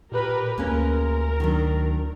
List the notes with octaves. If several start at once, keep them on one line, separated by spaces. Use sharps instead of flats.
A#2 G4 A#4 B4
D2 G#3 A#3 C#4 A#4
D#3 F#3 D4